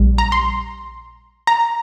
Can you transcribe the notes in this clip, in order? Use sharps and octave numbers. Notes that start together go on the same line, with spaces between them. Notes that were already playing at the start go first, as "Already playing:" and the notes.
Already playing: A#1 G3
A#5
C6
A#5